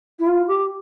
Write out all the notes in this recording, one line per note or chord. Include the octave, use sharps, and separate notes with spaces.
E4
F4
G4